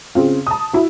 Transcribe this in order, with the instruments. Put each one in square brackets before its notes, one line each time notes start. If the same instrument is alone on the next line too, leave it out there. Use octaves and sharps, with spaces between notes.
[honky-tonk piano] C#3 C4 F4
A5 D#6
E4 F#4